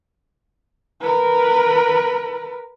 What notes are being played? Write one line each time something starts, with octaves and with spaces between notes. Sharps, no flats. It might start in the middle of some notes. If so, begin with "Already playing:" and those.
A#4 B4